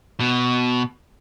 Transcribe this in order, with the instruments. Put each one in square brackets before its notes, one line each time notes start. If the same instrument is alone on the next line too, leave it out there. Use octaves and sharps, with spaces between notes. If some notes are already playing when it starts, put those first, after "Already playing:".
[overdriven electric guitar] B2